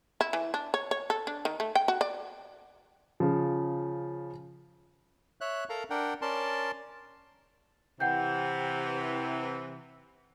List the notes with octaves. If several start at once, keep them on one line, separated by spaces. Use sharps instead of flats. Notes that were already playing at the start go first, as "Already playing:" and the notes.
E4
E3
D4
C#5
C#5
A4
D4
D#3
A3
G5
F#4
D5
C#3 F3
C#5 E5 F#6
A4 A#4 F5 A#5
D4 A#4 F#5 G5
C#4 A#4 D5 A5 C6
C3 E3 F#5 G5 G6